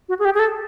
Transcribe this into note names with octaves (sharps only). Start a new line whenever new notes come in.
F#4
G#4
G4
G#4
A4